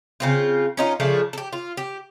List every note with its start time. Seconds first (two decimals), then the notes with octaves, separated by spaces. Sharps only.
0.20 C#3 C4 F4
0.77 C#4 D#4 F4
1.00 C#3 F3 A3 D4
1.33 G4 A4
1.53 F4
1.77 G4